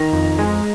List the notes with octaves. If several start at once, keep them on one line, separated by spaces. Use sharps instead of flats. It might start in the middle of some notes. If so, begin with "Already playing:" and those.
Already playing: D#3 A#5
F2
G#3